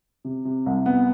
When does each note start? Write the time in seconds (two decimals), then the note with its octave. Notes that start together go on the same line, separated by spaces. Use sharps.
0.25 C3
0.45 C3
0.66 C2
0.86 B3